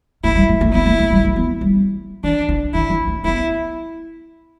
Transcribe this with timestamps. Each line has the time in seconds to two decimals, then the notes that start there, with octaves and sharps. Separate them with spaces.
0.24 A3 E4
0.35 G3
0.49 A3
0.61 A3
0.73 B3 E4
0.86 A3
0.99 A3
1.11 G3
1.24 A3
1.36 B3
1.61 G3
2.24 E3 D4
2.49 E3
2.73 E3 E4
2.90 F3
3.08 A3
3.24 B3 E4